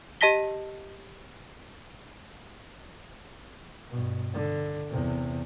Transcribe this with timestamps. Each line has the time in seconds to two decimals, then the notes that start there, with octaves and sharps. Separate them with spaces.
0.21 G4 D#5 A5 A#6 B6 G7
3.90 G2 B2
4.34 D3
4.89 E2 C3